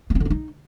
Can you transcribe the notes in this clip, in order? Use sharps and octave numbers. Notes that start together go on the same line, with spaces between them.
B3
C4
D3
C4
D#4